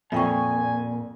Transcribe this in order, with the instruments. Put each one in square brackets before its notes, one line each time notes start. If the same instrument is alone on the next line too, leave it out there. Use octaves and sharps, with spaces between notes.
[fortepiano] F2 [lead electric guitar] A#2 [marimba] E5 G5 C#6 [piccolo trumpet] G#5